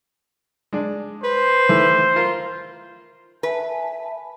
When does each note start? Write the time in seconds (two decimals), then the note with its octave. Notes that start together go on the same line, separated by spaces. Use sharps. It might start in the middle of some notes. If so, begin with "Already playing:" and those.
0.73 G#3 D4 D5
1.24 B4 C5
1.69 D#3 E3 A3
2.16 F4 A#4
3.43 B4 E5 G#5 A5